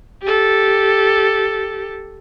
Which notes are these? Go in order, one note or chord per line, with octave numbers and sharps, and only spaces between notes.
G4 A4